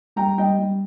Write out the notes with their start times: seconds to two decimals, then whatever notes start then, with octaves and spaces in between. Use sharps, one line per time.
0.16 G3 G5 A#5
0.38 G3 D#5 G5
0.59 G3